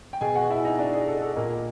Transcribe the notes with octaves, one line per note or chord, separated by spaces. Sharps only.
G5
B2 G#4 G#5
F#4 F#5
E4 E5
D#4 D#5
D4 D5
G#4
A4
A4
A#2 A#3 A#4